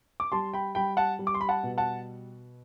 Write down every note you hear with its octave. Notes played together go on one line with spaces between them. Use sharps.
D6
G3 A5 C6
G5 B5
G3 G5 B5
F#5 A5
G3
D6
C6
B5
F#5 A5
B2
F#5 A5